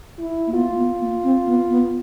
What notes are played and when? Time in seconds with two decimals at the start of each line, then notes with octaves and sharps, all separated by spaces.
0.19 E4
0.47 A#3
0.54 B3 F4
0.71 A#3
0.77 B3
1.00 A#3
1.24 C4
1.47 B3
1.70 B3